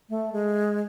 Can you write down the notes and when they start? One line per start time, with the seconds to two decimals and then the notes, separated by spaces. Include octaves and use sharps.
0.09 A3
0.32 G#3